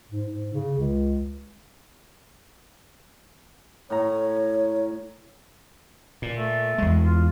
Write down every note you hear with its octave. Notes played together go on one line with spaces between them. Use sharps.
G#2
G#2
C#3
C#2
A2 C#5 A#5
A#2
A3
E2 G#3
F4